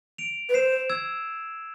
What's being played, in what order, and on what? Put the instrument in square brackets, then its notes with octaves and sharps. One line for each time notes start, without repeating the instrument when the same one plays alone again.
[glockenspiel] D7 F7
[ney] B4
[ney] C5 [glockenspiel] C7 E7
[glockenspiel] E6 G#6